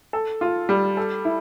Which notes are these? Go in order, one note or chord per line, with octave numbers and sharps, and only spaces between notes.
A4
F4
G3
A4
E4